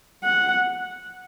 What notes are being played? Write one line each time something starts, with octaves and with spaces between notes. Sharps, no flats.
F#5